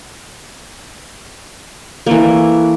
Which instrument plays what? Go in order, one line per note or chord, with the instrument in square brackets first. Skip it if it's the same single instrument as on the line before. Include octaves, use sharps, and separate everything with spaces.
[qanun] E3 A3 A#3